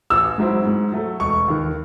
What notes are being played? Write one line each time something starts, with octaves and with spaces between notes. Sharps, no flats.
A1 E6
G#2 F#3 C4 E4
G#2
F#3 A3
E1 C#6
D#2 D#3